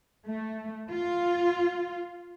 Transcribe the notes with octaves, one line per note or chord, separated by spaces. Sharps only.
A3
F4